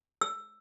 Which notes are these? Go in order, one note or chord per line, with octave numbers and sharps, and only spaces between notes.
E6